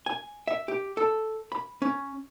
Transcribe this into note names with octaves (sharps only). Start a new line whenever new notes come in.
G#5
E5
G4
A4
B5
C#4